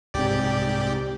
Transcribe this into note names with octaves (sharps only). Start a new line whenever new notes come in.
C2 G#2 C4 G4 D5